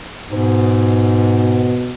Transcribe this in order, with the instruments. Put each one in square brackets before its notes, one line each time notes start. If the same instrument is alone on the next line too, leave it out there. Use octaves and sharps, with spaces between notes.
[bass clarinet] G#2 [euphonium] B2